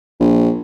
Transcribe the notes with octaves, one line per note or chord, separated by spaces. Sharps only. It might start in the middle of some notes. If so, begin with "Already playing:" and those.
A#1